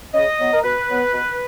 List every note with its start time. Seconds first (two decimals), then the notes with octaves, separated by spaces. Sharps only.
0.14 C#3 D#5
0.39 F#3 B3
0.53 A#4
0.63 B2 B4
0.89 F#3 B3
1.13 B2